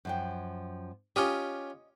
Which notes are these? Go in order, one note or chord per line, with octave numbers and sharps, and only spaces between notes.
F#2 F3 G5
C#4 F4 G4 D#5